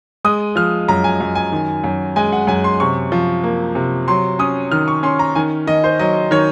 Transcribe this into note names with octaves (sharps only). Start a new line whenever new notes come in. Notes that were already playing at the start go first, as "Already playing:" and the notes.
G#3 D#6
F3 F6
F#2 A#5
G#5
F#2
G#5
D#3
F#2
G#3 G#5
F#5
F#2 G#5
C6
C3 C#6
F3
A#3
C3
F#3 C6
C#4 D#6
D#3 F6
C#6
C#4 C6
A#5
D#3 G#5
D#3 D#5
C5
F#3 D#5
D#3 C#5